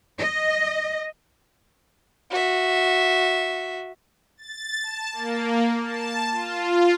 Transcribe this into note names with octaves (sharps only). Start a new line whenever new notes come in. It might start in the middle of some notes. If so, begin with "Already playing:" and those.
D#5
F#4 E5
A6
A5
A#3
A5
F4